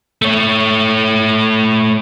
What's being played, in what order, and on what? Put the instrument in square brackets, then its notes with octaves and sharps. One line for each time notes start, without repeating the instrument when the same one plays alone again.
[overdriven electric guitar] A3 C#5